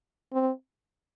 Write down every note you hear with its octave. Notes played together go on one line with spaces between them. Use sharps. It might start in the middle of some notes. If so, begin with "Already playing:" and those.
C4